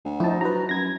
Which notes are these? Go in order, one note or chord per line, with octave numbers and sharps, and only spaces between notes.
D2
F3 D#4 E4 A5
F#3 B4 A#5
F#2 G#6 A#6